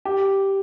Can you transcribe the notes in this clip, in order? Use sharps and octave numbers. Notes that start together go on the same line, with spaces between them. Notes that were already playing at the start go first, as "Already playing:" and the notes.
G4